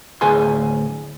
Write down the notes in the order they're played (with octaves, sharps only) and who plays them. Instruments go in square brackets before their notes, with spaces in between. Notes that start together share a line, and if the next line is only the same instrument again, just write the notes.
[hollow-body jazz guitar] D2 A2 G#4 B4 G#5 C6